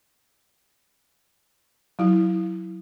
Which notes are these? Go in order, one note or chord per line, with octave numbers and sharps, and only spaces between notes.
F#3 E4